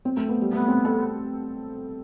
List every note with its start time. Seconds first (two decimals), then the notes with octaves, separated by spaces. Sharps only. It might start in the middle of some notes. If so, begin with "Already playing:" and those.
0.05 C4
0.17 A3
0.29 B3
0.41 G3
0.52 A3 B3
0.68 C4
0.85 A4